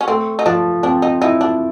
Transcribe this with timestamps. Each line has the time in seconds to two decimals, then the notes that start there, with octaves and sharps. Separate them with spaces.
0.01 C#4
0.08 A3 C4
0.39 D#4
0.46 F3 D4
0.83 C4 D4
1.02 D#4
1.22 D#4 E4
1.41 D4